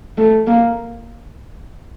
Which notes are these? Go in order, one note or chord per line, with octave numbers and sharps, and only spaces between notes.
A3
A#3